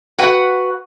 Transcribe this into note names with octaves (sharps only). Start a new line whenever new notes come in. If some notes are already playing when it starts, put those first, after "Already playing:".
F#4 B4 F#5